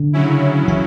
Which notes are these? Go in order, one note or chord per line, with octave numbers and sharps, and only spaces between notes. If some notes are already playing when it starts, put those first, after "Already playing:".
Already playing: D3
C#3 F#3 C#4 E4
E3